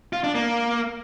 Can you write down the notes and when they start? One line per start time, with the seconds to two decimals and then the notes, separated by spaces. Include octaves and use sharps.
0.13 F4
0.24 D4
0.35 A#3